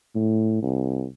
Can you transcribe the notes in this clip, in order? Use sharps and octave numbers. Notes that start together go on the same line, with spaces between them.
A2
C2